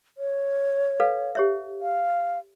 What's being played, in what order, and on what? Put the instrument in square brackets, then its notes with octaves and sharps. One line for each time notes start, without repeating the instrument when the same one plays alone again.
[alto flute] C#5
[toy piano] A4 B4 F5
G4 C#5 E5
[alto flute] F5